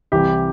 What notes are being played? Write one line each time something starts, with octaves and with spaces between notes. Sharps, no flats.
C2 C3 E3 G4